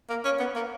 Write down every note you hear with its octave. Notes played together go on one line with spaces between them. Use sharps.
A#3
C#4
B3
A#3